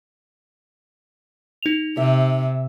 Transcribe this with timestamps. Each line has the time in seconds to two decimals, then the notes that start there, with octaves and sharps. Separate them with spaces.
1.63 D#4 F7
1.97 C3 E5